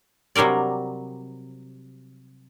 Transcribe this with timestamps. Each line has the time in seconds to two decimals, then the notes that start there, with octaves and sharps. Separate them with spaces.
0.36 C3 F#3 G3 A#4 D5